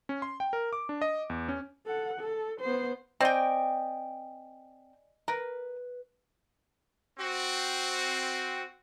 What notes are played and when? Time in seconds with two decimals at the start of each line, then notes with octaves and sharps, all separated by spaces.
0.09 C#4
0.22 C6
0.40 G5
0.53 A#4
0.73 D6
0.89 D4
1.02 D#5
1.30 E2
1.48 C#4
1.86 A4 F#5
2.20 A4
2.61 B3 C5
3.20 C4 D5 D#5 G5 G#5
5.28 A#4 B4
7.19 C4 F#4